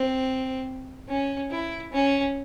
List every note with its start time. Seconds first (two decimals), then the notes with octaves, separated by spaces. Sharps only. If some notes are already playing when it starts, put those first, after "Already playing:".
Already playing: C4
1.08 C#4
1.51 E4
1.93 C#4